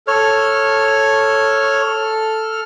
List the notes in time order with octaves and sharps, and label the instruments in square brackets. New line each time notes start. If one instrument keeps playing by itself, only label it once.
[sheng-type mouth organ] A4 F6 [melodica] C#5